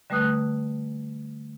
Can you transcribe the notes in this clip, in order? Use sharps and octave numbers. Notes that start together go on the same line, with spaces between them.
D3 G3 A3 B4 D#6 F#6